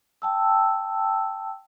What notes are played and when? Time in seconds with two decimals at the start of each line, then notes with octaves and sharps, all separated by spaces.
0.22 G5 A5 E6